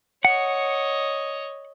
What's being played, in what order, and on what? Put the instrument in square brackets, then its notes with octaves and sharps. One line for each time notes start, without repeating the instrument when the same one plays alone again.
[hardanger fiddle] C#5 D#5 [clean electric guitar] F#5